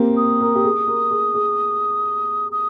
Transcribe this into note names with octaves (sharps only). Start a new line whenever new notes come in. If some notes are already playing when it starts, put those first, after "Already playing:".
Already playing: A#3 C4 G4
D#6
A#4
G4
G#4
A#4
G#4
G#4
D#6